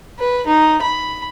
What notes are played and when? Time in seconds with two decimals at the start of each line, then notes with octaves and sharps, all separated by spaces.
0.18 B4
0.47 D#4
0.82 B5